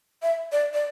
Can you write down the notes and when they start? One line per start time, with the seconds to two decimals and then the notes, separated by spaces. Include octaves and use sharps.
0.22 E5
0.52 D5
0.74 D5